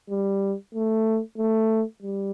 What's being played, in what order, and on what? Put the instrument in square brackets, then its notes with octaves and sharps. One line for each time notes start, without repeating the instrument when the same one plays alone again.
[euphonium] G3
A3
A3
G3